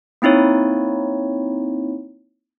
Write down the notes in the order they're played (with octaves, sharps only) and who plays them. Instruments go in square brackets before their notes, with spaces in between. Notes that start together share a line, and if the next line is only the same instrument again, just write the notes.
[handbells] A#3 C4 D#4 E4 C#5